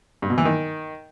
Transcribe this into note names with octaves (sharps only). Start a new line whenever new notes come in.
G2
B2
E3
D#3